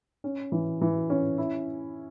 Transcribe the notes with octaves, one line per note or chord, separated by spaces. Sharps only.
C#4
E3
E3
C#4
E4